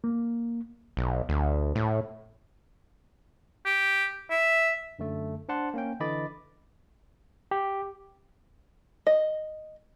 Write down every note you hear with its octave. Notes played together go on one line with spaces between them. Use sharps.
A#3
B1
D2
A2
G4
E5
F#2 D3 A3
D4 C5 D5 F#5 A5 C6
A#3 C#4 G5
D3 E3 D#5 B5 D6 A6
G4
D#5